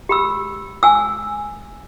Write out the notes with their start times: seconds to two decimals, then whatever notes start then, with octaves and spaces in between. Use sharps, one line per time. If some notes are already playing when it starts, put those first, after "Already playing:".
0.09 G4 B5 E6
0.83 G#5 E6